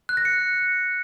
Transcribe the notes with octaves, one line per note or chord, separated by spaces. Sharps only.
F#6
A#6
C#7